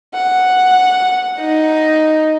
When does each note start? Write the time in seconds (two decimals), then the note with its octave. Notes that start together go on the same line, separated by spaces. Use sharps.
0.14 F#5
1.40 D#4